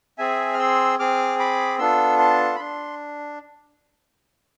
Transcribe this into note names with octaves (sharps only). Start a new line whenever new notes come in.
C4 G#4 E5 G#5
F6
C6 E6
C4 G#4 D6 F6
B5 D6
B3 D4 F4 A4 C6 E6
A5 C6
B5
D4 C6